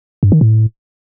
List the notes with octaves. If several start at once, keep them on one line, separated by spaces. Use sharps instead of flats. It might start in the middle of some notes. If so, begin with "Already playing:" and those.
G2
D#3
A2